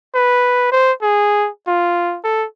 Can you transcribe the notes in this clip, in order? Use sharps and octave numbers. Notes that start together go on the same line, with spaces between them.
B4
C5
G#4
F4
A4